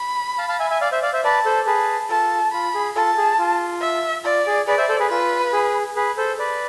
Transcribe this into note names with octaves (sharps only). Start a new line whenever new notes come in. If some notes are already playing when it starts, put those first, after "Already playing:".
Already playing: B5
F5 A5
F5 A5
E5 G#5
E5 G#5
D5 F5
C5 E5
D5 F5
C5 E5
B4 D5 A5
A4 C5
G#4 B4 A5
F4 A4 A5
F4 B5
G#4
F4 A4 A5
G#4
F4
E5
F4 D5
G#4
G#4 B4 D5
C5 E5
A4 C5
G#4 B4
F4 B4
G#4
G#4 B4
A4 C5
B4 D5